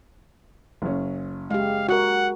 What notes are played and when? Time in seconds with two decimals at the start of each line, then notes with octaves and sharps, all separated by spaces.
0.82 F#1 C#4
1.51 G#3 G4 F5
1.89 F#4 A#4 F#5